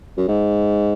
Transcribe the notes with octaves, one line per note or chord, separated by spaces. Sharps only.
F#2
G#2